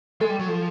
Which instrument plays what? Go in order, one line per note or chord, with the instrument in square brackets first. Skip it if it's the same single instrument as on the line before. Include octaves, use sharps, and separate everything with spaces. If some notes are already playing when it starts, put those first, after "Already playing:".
[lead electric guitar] G#3 [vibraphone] A4
[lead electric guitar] G3
F#3
F3